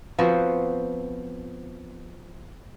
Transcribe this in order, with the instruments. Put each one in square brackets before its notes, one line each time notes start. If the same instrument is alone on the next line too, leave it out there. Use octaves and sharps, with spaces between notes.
[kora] F3 B3 C4 F#4